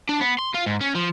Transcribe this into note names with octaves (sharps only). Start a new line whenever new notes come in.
D4
B3
C6
F4
G#2
C#4
F3